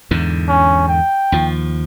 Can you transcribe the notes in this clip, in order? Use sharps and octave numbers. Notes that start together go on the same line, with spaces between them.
E2 G#2 D3
C#4
G5
D#2 F3